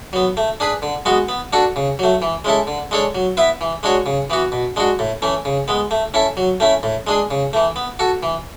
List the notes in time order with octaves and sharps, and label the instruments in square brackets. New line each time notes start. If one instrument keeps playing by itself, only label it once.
[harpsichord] F#3 B3
A3
D4 G#4 B4
D3
G#3 B3 F#4
B3
D4 F#4 A4
C#3
F#3 A3
E3
G#3 C#4 E4 A4
D3
G#3 D4 A4 C#5
F#3
B3 E4 B4 E5
E3
G#3 D4 F#4 C#5
C#3
E3 B3 F#4
B2
G#3 D4 F#4
A2
E3 A3 C#4
C#3
G#3 B3
A3
C#4 E4 A4
F#3
A3 C#4 E4
A2
G#3 D4 G#4
C#3
E3 A3
B3
F#4 A4
E3